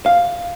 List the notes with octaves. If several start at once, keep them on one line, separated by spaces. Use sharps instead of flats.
F5